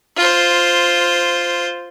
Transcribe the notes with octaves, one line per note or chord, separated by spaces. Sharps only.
F4 C5